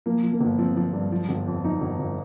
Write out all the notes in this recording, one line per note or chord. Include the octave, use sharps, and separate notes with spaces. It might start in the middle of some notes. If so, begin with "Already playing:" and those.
F3 A#3
F3
A#3
G1
F3 C4
F3
G2
F3
G1
F2
F3 D#4
G1
G1